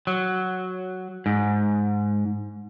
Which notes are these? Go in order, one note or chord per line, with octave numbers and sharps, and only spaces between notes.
F#3
G#2